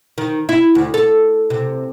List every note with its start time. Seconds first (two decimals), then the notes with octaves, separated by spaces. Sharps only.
0.18 D#3
0.49 E4
0.75 D2
0.94 A4
1.50 C3